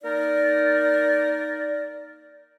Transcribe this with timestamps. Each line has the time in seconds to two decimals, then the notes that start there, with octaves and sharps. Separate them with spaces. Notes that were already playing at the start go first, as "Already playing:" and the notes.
0.03 A#3 D#4 A#4 D5